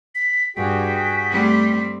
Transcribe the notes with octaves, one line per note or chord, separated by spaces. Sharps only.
B6
G2 F#4 G#4 G5 B6
G3 A3 C4